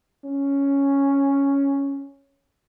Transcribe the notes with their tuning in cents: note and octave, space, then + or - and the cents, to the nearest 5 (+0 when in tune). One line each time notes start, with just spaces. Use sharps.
C#4 +0